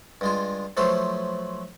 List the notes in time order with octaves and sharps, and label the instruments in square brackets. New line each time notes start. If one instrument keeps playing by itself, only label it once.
[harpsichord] G2 G#3 F4
F3 F#3 A3 B4 C5